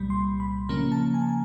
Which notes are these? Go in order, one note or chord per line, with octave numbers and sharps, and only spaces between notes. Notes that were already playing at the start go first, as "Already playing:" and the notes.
Already playing: C2 A#2 G3 B5
C6
B5
C#3 F3 A#3 C#4 A#5
A5
G#5
A5
G#5